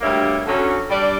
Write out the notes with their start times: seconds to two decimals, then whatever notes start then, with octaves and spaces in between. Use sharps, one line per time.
0.01 D2 G3 A#3 G4 C#5 E5
0.47 D3 F#3 C#4
0.90 G3 D4 D5